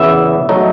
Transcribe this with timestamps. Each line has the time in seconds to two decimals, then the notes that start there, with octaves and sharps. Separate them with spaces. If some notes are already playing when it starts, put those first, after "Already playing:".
Already playing: E2 C#3 E3 B3 E5
0.49 F#3 A3 D#4